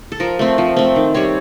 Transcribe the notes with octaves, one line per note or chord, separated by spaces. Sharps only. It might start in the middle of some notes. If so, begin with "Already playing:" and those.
A4
F3 A#4
A3 C4
F3
A3 C4
D#3
G3 C4 C#5